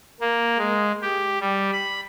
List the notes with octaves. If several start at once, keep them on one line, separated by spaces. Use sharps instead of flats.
A#3
G#3
G4
G3
B5